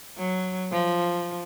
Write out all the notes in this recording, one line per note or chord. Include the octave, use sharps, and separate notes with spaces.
F#3
F3